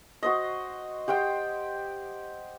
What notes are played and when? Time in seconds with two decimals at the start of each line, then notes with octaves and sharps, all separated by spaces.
0.23 F#4 C5 D#5
1.08 G4 C5 F#5 G5